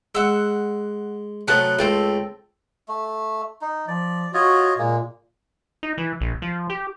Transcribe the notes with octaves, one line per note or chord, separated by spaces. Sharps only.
G#3 F#5 E6
C3 F#3 A3 B3 A5 F#6
C#2 A3 C4 G5 A5
A3
D#4
F3 D5
F4 F#4 C#5 D#5
A#2 G#3 A#3
D#4
E3
A#1
F3
G4